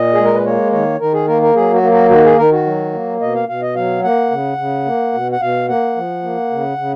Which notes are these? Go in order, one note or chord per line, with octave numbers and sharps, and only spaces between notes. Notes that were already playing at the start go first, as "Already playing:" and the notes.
Already playing: A#2 D#5
G#3 G#4
A#4
B4
A#3 C#5
D#3 C#5
D#3 A#4
G#4
A#3 A#4
A#4
F#3 G#4
F#4
A#3
F#4
D#3 F#4
G#4
D#3 A#4
F#4
F#3
A#3
B2 D#5
F5
B2 F5
D#5
F#3 F5
A#3 F#5
C#3
C#3
A#3
B2
F#5
B2 F5
A#3 F#5
F3
A#3
C#3
C#3